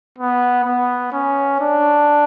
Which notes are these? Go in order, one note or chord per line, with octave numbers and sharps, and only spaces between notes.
B3
B3
C#4
D4